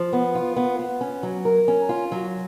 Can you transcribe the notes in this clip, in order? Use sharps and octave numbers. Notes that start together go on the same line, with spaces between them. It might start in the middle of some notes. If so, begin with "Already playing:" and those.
Already playing: F3
B3
F4
B3
B3
C#4
F#3
A#4
C#4
F4
F#3